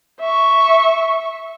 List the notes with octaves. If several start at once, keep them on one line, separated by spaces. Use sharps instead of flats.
E5 C#6